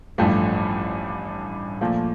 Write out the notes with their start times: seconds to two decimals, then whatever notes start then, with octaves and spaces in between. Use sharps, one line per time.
0.18 A1 G2 F3 A3
1.81 A#2 F3 A3